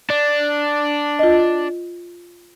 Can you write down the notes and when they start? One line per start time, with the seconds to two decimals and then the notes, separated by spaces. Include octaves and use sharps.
0.10 D4
1.19 F4 D#5